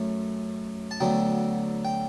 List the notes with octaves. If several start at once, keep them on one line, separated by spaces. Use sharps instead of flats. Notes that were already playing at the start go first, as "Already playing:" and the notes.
Already playing: F#2 A3 C#4
A5
D2 D3 F#3 B3 G5
G5